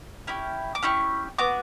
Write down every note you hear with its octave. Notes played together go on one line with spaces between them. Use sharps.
C#4 E4 G4
D6
C#4 E4 G4 C#6
B3 F#4 D6